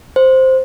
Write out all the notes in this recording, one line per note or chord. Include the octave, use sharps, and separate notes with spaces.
C5